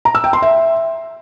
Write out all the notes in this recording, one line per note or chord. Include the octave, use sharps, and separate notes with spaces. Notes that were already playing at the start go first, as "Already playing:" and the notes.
A#5
E6
G5
C6
E5